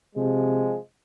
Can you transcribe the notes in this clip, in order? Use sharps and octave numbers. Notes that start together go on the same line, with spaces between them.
C3 F3 G#3